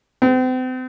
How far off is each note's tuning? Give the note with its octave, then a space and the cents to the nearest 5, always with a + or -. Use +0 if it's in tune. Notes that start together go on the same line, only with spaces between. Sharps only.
C4 -40